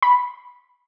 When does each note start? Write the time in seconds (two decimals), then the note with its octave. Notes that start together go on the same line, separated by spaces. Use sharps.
0.02 B5